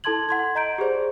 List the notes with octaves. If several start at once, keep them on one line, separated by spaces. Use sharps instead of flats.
E4 A4 A5 C6 G#6 F#7
F#5 C6 G#6
D#5 A#5 G6 D7
G4 G#4 C5 D5